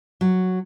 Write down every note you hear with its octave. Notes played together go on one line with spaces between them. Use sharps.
F#3